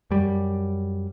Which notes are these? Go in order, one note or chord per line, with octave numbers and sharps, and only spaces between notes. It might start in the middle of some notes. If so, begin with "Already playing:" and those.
F#2 G3